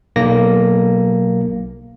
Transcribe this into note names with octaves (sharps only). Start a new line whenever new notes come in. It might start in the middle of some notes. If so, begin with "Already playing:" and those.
B1 A#3 A#6